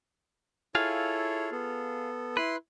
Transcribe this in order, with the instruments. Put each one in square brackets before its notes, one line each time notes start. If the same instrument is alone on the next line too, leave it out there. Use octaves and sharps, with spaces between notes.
[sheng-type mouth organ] E4 A4 C#5 [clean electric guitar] F4 G#4 F5
[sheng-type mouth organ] B3 A4
[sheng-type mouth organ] E4 C6 [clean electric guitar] B4